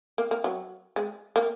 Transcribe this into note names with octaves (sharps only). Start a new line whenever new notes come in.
A#3
A#3
F#3
G#3
A#3